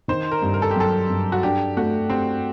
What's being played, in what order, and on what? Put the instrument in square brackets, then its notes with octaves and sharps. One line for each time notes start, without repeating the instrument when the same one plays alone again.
[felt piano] D#3 [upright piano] C5
[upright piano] A#4
[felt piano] G2
[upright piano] A#4
A4
G4
[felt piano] F#3 [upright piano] A4
[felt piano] G2
[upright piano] F#4
[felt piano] D4 [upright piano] G4
[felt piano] A3 [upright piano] F#4
[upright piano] C4 [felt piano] G4